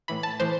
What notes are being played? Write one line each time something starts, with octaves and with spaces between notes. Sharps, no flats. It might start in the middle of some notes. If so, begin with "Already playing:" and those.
A2 E3 B5
A5
A2 E3 C5